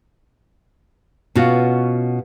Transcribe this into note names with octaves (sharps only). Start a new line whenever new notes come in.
B2 C#4 F4 F#4